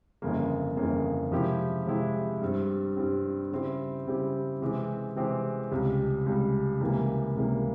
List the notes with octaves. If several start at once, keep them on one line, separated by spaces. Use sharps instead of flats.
G1 F2 C#3 E3 A#3
G1 F2 C#3 E3 A#3
C3 F3 G#3 E4 G4
C3 F3 G#3 E4 G4
G2 G3 C4
G2 G3 C4
C#3 G3 C4 E4 G4
C#3 G3 C4 E4 G4
C3 E3 G#3 C4 G4
C3 E3 G#3 C4 G4
C#2 C3 G3
C#2 C3 G3
C#2 C3 E3 G3 A#3
C#2 C3 E3 G3 A#3